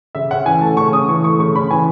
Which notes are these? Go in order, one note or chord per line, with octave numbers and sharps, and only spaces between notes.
C#3 E5
C#4 F#5
E3 G#5
A3 A5
C#3 C#6
C#4 D#6
E3 C#6
A3 C#6
C#3 C#6
C#4 B5
E3 G#5